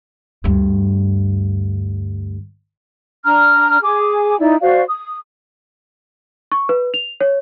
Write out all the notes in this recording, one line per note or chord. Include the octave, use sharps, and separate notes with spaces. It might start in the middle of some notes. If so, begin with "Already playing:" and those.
D2 G2
D4 A#5 F6
G#4 G#5 D6
D#4 E4 D5
F#4 C5 D5 F5
D#6
C#6
B4
F7
C#5